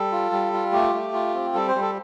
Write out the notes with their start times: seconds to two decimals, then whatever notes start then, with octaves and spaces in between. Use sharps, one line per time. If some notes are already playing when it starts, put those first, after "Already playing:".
Already playing: G3 A4
0.12 F4
0.32 G3
0.53 F4
0.72 A3 G4
0.93 A3
1.13 F4
1.34 C4
1.55 G3 A4
1.68 C5
1.75 G3
1.81 A4